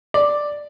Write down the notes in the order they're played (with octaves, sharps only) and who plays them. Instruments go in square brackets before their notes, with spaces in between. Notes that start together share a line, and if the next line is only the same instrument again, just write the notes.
[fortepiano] D5